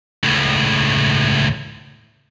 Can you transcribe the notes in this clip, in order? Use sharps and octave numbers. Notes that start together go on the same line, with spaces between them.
C#2 A2